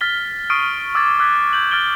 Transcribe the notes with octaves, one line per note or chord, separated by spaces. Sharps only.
F6 A6 B6 G7
C#6 D#6 F6 C7 D7 D#7
D6 E6 F6 G#6 A6
D6 E6 F#6 G#6 B6
G6 F#7
F6 A6 D7 G7